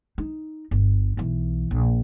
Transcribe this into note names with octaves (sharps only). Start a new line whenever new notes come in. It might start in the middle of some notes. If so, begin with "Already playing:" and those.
D#4
G1
B1 E3
A#1